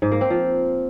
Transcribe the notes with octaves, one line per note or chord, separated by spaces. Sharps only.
G#2
A#3
C4
F3